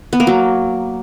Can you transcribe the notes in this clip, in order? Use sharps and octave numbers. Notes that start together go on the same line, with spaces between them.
B3
A#3
F#3